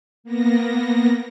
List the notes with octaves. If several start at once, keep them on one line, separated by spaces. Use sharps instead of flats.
A#3 B3 A#6